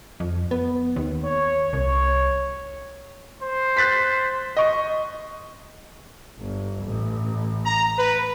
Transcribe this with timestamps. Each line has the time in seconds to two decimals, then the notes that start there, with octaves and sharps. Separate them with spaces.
0.20 F2
0.51 B3
0.96 D#2
1.25 C#5
1.73 C2 C#5
3.42 C5
3.77 F#6 A6 B6
4.56 D#5 C#6
6.39 G1
6.84 A1
7.65 A#5
7.96 B4